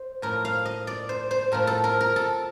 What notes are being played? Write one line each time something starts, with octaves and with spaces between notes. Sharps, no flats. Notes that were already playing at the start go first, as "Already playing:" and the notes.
Already playing: C5
A2 F3 A#4
F5
D#5
D5
C5
C5
A2 F3 A#4
A4
A#4
A#4
A4